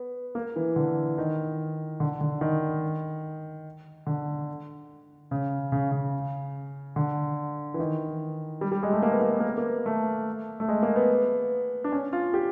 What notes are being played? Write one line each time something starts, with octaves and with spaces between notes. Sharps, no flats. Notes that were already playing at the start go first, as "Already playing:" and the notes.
Already playing: B3
A#3
E3
D3
D#3
D3
D3
D#3
D3
C#3
C#3
C#3
D3
E3
D#3
G3
G3
G#3
A3
A#3
B3
A#3
B3
A#3
B3
A#3
A3
A3
G#3
A#3
B3
D4
C#4
F4
G4